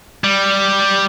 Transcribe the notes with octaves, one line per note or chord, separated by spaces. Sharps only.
G3